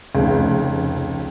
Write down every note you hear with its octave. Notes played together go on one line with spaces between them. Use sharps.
F1 C#2